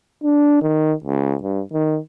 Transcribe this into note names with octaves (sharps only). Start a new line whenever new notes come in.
D4
D#3
C#2
G2
D#3